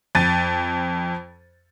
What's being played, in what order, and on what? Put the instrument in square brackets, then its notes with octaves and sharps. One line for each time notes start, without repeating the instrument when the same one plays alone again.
[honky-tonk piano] F2 A6 D#7